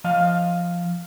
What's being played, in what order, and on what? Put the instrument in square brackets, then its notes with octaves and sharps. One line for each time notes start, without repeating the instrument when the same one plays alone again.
[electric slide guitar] F3 D#5 F5